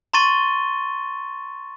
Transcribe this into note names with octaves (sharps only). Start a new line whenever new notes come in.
A#5 C6 C#6 A6 D#7 G7